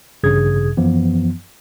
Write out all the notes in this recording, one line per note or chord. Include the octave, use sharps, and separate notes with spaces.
A1 G2 C#3 G#4 D#6 G#6
F#2 E3 F3 B3